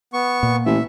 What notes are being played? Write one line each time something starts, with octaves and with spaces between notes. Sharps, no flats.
B3 C#6
A#2
A1 E5